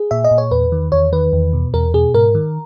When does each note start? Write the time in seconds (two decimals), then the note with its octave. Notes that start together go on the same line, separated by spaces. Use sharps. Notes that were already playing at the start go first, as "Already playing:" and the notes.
Already playing: G#4
0.11 A#2 E5
0.24 D#5
0.31 A#2
0.38 C#5
0.51 E2 B4
0.72 D#3
0.92 E2 C#5
1.12 D#3 B4
1.33 E2
1.53 B2
1.74 E2 A#4
1.94 B2 G#4
2.14 G#2 A#4
2.35 D#3